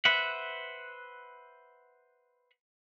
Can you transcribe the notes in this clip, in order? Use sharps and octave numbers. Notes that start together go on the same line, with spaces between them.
B4 C5 E5 F#5